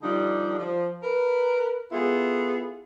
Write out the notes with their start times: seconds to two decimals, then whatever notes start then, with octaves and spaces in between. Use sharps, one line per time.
0.03 D3 F3 G3 D4 D#4
0.58 F3
1.03 A#4 B4
1.91 B3 E4 F4 G#4 A4